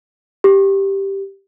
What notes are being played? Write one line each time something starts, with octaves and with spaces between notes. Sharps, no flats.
G4